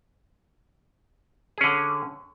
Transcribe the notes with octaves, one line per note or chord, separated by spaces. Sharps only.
D3 C#4 G#4